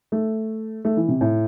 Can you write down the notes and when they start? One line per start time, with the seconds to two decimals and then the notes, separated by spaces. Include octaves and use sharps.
0.12 A3
0.85 A3
0.97 E3
1.08 C3
1.21 A2